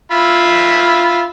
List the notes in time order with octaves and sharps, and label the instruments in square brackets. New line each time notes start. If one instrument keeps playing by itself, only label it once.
[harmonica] F4 E5 B5